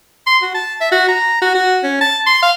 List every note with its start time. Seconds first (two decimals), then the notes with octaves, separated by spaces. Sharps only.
0.26 C6
0.42 F#4
0.54 A5
0.81 E5
0.92 F#4
1.09 A#5
1.42 F#4
1.55 F#4
1.84 C#4
2.01 A5
2.26 C6
2.42 F5